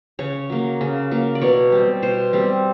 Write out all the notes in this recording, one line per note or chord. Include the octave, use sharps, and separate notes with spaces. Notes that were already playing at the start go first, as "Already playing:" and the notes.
C#3 C#5
F#3 A#3
C#3
F#3 A#3
D5
B2 C#5
G3 C4
B2 C5
G3 C4